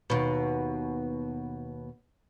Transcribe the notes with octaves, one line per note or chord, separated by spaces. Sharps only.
D#2 B2